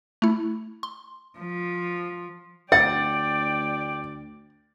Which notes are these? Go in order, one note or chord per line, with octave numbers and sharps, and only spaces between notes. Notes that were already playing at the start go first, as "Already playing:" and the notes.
A3 E4
C6
F3
D2 D5 F#5 G5 A6